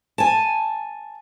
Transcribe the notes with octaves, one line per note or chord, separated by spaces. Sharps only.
G#5 A5